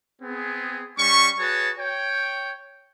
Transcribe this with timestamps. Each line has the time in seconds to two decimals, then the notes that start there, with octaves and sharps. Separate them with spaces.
0.21 B3 C4 G#4
0.98 G3 C#4 C#6
1.39 F#4 G#4 B4 C#5 A5
1.78 C#5 G5